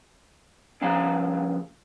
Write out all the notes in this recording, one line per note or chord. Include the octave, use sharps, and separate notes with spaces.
A#2 C#3 F3 F5 A#5